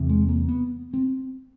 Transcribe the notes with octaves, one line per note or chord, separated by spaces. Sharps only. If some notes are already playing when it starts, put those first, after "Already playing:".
Already playing: E2 C3
G#3
A#3
B3
C4